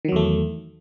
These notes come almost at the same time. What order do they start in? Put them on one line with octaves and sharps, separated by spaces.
D#3 F#3 E2 A3